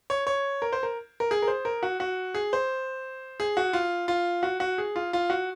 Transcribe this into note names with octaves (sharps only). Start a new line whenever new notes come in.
C#5
C#5
A#4
C5
A#4
A#4
G#4
A#4
C5
A#4
F#4
F#4
G#4
C5
G#4
F#4
F4
F4
F#4
F#4
G#4
F4
F4
F#4